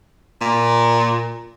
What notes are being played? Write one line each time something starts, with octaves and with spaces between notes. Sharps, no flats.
A#2